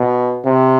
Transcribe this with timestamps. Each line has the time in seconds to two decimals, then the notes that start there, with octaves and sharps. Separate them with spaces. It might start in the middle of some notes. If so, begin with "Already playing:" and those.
Already playing: B2
0.45 C3